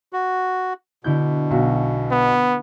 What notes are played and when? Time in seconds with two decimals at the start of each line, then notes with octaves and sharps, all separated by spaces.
0.13 F#4
1.04 B2 D3 E4 G6
1.51 B1 F#4
2.11 B3